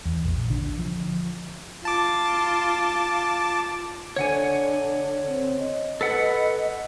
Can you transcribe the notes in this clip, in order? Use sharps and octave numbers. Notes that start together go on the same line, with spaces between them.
E2
A#1
D3
F3
F4 A5 D6
D3 C#5 F#5 G#5
C4
D#5
A4 B4 F#5